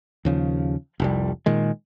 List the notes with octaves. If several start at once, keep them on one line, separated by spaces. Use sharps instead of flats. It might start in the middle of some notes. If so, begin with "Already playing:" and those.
D#2 C#3 F3
F1 C2 G3
A#2 D#3 G#3